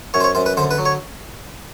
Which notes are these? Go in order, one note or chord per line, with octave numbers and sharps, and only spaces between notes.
F#2 C#5
C5
C#5
F#2 C5
B4
D3 C5
B4
F#3
C#5